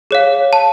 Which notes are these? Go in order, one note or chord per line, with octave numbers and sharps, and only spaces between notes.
G#4 C#5 F5
A5